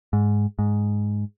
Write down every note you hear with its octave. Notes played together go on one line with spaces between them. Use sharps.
G#2
G#2